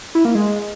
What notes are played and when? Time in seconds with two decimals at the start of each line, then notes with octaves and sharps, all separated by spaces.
0.15 E4
0.25 A#3
0.35 G#3